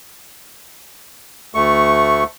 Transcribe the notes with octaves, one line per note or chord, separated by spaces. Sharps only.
D2 A3 C#6